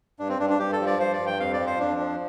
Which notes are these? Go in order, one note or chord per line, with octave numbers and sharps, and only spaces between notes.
G2 D4
C4
G2 D4
D4
G2 G4
A4
F3
D5
G2 C5
D5
G2
G5
F2 F5
D5
F3
C5
F2 D4
F3